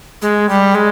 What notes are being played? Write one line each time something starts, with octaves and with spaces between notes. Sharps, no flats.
G#3
G3
G#3